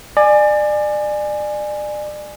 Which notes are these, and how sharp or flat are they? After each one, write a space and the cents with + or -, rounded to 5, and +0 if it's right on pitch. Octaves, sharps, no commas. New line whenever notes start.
D5 +30 G#5 +0